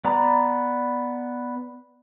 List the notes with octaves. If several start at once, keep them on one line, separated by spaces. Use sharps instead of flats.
B3 D5 A#5 B5